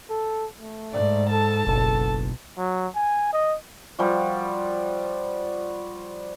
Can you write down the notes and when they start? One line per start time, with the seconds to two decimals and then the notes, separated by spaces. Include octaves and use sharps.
0.10 A4
0.58 A3
0.93 G#2 D5
1.30 A4 A5
1.67 F#1 B1 A4
2.58 F#3
2.95 G#5
3.33 D#5
3.99 F3 G3 F#4